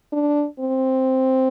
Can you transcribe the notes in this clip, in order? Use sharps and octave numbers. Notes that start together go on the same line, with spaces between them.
D4
C4